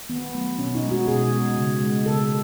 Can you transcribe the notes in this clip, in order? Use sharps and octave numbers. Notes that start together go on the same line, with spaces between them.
D#3 B3
F#3 A3
B2 C#4
D#4
G#3
F#4
B2 G#4
G#3
C#3
G#3
C#3 A4